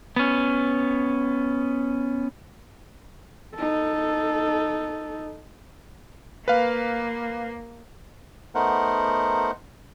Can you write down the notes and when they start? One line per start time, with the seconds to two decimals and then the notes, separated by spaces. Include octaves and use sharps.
0.16 B3 C#4
3.55 D#4 A4
6.48 A#3 B4 F5
8.55 A3 B3 D#4 A#4 C5 F#5